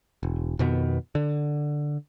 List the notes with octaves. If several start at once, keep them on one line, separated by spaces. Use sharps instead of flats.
E1
F2 B2 D#3 B3
D3